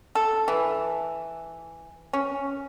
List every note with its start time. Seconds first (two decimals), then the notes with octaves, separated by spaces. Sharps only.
0.15 A4
0.48 E3
2.13 C#4